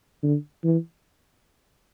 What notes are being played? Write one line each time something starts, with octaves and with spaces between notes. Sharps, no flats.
D3
E3